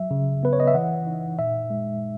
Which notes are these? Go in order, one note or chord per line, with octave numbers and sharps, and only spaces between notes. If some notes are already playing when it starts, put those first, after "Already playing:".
Already playing: F#3 E5
C#3
B3 B4
C#5
D#5
E5
E3 F#5
D#4
A#2 E5
G#3